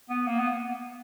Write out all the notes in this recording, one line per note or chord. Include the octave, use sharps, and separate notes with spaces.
B3
A#3
B3